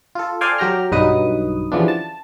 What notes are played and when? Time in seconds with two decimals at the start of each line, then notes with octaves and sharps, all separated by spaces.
0.15 F4 A4
0.41 A4 C5 D5 F5 G5 G#5
0.58 F#3 G4 G5 A#5 F6
0.91 B1 G2 F#3 D#4 B4 D#6
1.72 C#3 E3 F3 G3 B3 D4
1.88 A5